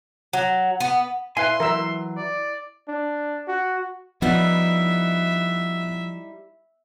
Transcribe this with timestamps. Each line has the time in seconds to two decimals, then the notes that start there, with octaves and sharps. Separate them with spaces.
0.33 F#3
0.80 B3
1.37 E4 B4 F5 G#5 C6
1.60 E3 F#3 A#4 E5 E6
2.18 D5
2.88 D4
3.48 F#4
4.22 F3 G3 B3 D#4 E4 E5